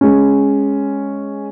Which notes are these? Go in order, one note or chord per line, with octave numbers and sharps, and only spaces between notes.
G#3 C#4